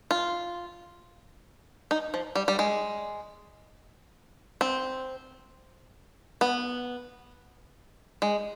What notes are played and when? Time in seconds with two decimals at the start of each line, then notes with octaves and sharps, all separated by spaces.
0.11 F4
1.91 D#4
2.14 F3
2.35 G3
2.48 G3
2.59 G#3
4.61 C4
6.41 B3
8.22 G#3